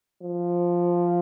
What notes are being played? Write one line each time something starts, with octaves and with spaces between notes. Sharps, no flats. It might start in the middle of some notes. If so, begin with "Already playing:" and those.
F3